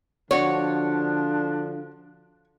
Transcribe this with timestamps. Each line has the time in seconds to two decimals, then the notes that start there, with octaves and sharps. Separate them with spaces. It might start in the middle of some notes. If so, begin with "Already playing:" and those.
0.31 D3 F3 D4 F#4 C#5 D5